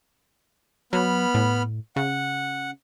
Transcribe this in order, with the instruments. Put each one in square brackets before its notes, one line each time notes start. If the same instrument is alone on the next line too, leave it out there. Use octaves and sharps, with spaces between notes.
[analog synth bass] F#3 [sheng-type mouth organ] B3 B5 F6
[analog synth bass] A2
[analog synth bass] C#3 [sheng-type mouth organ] F#5